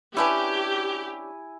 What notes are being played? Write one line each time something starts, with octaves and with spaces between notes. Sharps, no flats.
C#4 D4 E4 G4 B4 G#5